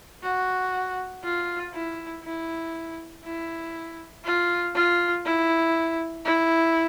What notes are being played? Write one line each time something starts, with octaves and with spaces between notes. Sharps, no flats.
F#4
F4
E4
E4
E4
F4
F4
E4
E4